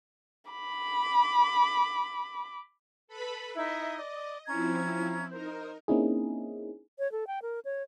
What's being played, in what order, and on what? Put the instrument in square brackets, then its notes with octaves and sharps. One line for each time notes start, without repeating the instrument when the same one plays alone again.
[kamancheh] B5 D6
[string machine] A4 B4 B5
[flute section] D#4 E4 E5 [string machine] D#5
[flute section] D5
[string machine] F3 C4 E4 [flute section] C#4 A#5 G#6
[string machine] D#4 A#4 [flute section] C5
[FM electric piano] A#3 C4 C#4 D#4 E4 G#4
[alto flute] C#5
A4
G5
A#4
C#5